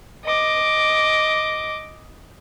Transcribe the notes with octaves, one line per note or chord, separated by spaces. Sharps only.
D#5 D6